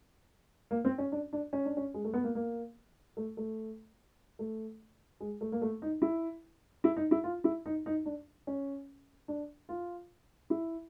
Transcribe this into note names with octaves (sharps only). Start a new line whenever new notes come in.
A#3
C4
C#4
D4
D4
C#4
D4
C#4
G#3
A3
B3
A#3
A#3
A3
A3
A3
G#3
A3
A#3
A3
D#4
E4
E4
D#4
E4
F4
E4
D#4
D#4
D4
C#4
D4
F4
E4